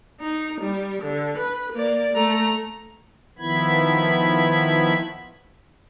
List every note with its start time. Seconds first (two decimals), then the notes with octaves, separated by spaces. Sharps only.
0.21 D#4
0.60 G3
1.02 D3
1.37 B4
1.73 A#3 D5
2.13 A3 A#5
3.38 D#3 F3 B3 E4 B5 G#6